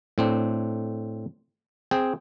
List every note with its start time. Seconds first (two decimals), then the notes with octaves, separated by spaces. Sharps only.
0.18 A2 C4 D4
1.91 C4 G#4 G5